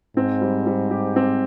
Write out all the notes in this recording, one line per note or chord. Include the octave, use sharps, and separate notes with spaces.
G#2 C4
G3
G3
G4
C4